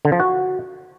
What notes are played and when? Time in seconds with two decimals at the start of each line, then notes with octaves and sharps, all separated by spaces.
0.05 D3
0.12 F3
0.20 F#4